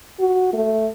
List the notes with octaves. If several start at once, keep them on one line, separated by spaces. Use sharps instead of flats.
F#4
A3